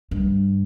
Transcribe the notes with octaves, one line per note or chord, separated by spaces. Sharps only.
G2